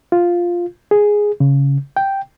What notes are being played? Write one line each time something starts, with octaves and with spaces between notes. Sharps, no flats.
F4
G#4
C#3
G5